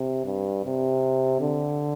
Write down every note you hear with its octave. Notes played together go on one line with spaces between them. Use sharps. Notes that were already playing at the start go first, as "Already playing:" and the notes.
Already playing: C3
G2
C3
D3